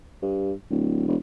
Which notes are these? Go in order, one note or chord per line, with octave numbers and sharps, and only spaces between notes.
G2
D1
E1